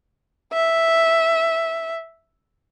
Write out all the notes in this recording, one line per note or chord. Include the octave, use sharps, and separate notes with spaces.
E5